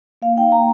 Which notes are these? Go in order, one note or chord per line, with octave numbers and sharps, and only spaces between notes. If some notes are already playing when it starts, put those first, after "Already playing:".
A#3 F5
D#4 G5
A#3 A#5